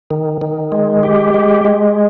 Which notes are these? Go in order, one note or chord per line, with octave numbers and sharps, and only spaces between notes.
D#3
D#3
G#3
G4
G#3
G#3